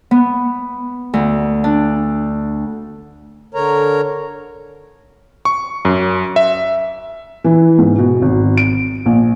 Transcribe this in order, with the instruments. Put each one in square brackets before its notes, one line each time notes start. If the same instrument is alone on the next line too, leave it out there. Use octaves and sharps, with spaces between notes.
[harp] B3
D2
D4
[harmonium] D3 A#4 C#5 A#5
[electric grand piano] C#6
F#2
E5
[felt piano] E3
G#2
B2
G#1
D7
A#1